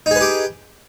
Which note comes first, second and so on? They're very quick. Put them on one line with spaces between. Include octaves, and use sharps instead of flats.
D#4 G#4 B4 G4